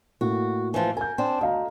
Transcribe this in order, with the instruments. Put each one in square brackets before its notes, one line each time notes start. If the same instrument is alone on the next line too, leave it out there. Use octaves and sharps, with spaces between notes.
[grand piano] A2 A#3 [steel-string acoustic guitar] F#4
[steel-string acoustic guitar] E3 F3
[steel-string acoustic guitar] A#4 [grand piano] G#5 G6
[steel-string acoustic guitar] C4 D4
[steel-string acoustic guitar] D2 [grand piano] D#5 F5 A#5